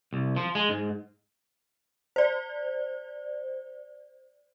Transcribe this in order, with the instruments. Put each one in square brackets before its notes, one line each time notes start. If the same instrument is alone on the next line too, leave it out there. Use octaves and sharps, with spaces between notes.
[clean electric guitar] C2
F3
G#3
G#2
[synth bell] C5 D5